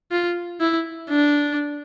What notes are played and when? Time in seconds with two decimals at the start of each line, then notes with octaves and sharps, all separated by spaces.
0.11 F4
0.61 E4
1.10 D4